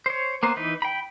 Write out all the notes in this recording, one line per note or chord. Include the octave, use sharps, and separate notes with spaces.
C5 C#5
A#3 B3 C5
E3 D#4 B4
G5 B5